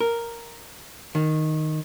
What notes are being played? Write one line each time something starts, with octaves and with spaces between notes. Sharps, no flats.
A#4
D#3